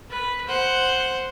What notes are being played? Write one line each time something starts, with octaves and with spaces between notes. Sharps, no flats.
B4
C5 F#5